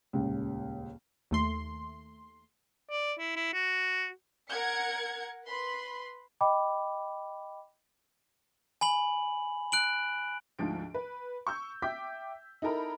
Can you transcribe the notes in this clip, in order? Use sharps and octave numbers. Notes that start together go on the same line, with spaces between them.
D#1 C#2
D#2 A3 C6
D5
E4
E4
F#4
A#4 F#5 G#6 C#7
B4 B5 C6
D#5 G5 B5 D6
G#5 B5 F#7
F#6 D7 F#7
D2 G#2 F3 D7
B4
C#6 E6 G6
E5 G5 D6 G6 B6
D#4 E4 A4 A#4 A#5 B5